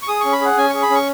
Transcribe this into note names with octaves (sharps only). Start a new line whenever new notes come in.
C#6
G#4 D#6
C#4 C#6
B5
G#4 F#5
C#4 G#5
G#4 C#6
B5
C#4 C#6